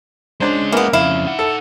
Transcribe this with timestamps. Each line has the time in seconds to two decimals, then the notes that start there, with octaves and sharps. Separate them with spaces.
0.40 G#3 C#4 D4 C5
0.72 E3 A#3 B3
0.93 F2 C#3 E4 F5
1.27 D#4 F#5
1.39 A4